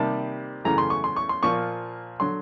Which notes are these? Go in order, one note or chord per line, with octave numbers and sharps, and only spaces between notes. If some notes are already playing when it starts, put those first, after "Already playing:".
Already playing: C3 D#3 G3 A#3 A5
F#2 C#3 E3 A3 A#5
C6
C#6
C6
C#6
C6
A#2 F3 A#3 C#6
D3 F#3 C6